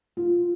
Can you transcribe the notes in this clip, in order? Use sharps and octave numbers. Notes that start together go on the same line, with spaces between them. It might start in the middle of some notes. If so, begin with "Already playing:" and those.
F4